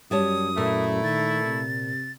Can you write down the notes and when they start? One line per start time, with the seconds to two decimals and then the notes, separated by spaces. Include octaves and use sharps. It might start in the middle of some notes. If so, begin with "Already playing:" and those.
0.11 F#2 G3 C#5 A5 D#6
0.57 A#2 A3 E4
1.04 D#3 A6
1.45 C3